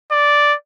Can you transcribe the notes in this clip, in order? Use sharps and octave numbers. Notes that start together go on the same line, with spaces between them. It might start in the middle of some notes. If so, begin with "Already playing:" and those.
D5